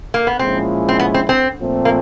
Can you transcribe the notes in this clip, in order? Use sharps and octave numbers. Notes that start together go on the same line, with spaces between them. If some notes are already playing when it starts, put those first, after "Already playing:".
A#3
B3
A#2 F3 G#3 C4 C#4 E4
C4
B3
C4
C4
A#2 F3 A3 C4
A#3